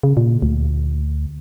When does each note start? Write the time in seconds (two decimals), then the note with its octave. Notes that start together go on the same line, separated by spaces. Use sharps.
0.03 C#3
0.17 A#2
0.42 D2